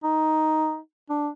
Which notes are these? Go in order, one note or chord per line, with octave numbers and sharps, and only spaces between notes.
D#4
D4